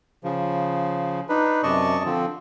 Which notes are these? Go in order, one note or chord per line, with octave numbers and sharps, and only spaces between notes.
C#3 F3
D4 D#4 B4
F#2 C3 D5 D#5 A5 C#6
D3 F3 C4